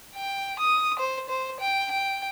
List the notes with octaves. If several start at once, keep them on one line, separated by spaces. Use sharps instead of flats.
G5
D#6
C5
C5
G5
G5